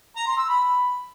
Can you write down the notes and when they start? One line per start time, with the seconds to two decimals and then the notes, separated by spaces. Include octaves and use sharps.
0.16 A#5
0.27 C6
0.38 E6
0.49 B5